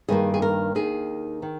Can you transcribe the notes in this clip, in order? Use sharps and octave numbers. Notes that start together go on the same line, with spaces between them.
G2 D#3 A#3 G#4
G#4
A#4
D#2 D#3 A#3 G#4
D#3